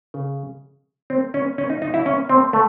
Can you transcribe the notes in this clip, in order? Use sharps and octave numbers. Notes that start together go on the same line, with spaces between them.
C#3
C4
C#4
C#4
D#4
D#4
E4
C#4
C4
A3